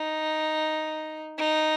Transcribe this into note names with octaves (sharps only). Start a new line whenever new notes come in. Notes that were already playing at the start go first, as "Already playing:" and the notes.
Already playing: D#4
D#4